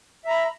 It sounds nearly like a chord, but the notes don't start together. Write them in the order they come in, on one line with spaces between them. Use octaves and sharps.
E5 A#5 B5